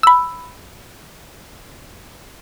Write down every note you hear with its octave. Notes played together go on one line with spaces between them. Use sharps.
B5 E6